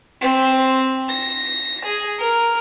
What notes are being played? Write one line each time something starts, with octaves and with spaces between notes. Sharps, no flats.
C4
A#6
G#4
A#4